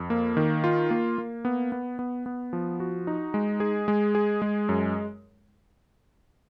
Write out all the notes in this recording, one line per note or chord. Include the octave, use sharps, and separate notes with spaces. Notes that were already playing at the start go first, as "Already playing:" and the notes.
Already playing: F2
A#3
D#3
F4
A#3
A#3
B3
B3
B3
B3
F3
F#4
D#4
G#3
G#4
G#3
G#4
G#3
F#2